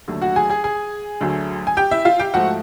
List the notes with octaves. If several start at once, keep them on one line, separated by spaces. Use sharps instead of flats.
D#2 D3 F#3 A3
F#4 F#5
G#4 G#5
G#4 G#5
G#4 G#5
D2 D3 F#3 A3
G#5
G4 G5
E4 E5
F4 F5
G4 G5
G#2 F3 A3 F#4 F#5